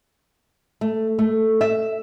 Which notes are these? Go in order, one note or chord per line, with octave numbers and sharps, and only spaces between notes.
A3
A3
E5